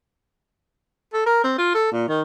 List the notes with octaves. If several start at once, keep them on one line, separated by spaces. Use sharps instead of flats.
A4
A#4
C4
F4
A4
A#2
D#3